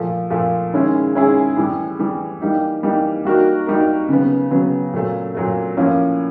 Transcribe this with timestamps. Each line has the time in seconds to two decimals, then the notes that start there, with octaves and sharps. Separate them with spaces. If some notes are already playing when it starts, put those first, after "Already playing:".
Already playing: A#2 F3 A3
0.30 A#2 F3 A3
0.73 D#3 G#3 C#4 E4 G#4
1.15 D#3 G#3 C#4 E4 G#4
1.56 A2 E3 G3
1.99 A2 E3 G3
2.41 E3 G3 A#3 D#4 G4
2.83 E3 G3 A#3 D#4 G4
3.25 G3 A#3 D#4 F#4 A#4
3.66 G3 A#3 D#4 F#4 A#4
4.09 C#3 F#3 B3
4.50 C#3 F#3 B3
4.93 A#2 F#3 A3
5.34 A#2 F#3 A3
5.77 A2 F3 A#3 C#4